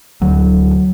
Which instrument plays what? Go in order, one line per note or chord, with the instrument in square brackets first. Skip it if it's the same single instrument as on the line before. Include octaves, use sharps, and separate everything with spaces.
[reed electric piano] D2 [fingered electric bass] F#3